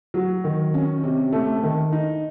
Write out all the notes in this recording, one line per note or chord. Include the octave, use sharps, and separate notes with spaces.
F#3
D#3
C#4
C3
A3
D#3
D#4